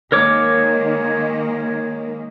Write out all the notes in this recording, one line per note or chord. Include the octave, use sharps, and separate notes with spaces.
D#3 G#3 A#3 A#4 C#5 D6